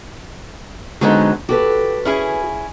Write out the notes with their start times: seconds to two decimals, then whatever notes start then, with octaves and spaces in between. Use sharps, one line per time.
1.01 D3 F#3 G#3 B3 C4 D#4
1.49 F#4 G4 A4 B4
2.05 C#4 E4 G#4